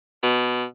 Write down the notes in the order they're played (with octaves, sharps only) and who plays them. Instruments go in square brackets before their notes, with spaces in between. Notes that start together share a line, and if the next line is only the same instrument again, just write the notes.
[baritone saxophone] B2